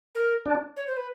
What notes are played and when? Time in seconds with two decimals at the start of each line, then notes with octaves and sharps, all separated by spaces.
0.15 A#4
0.46 D4
0.77 C#5
0.87 C5
0.97 B4